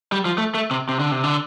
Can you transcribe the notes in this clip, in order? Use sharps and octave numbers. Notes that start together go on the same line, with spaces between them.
G3
F3
A3
A3
C3
C3
D3
C3
D3